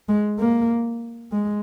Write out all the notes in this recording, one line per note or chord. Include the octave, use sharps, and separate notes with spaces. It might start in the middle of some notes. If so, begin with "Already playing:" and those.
G#3
A#3
G#3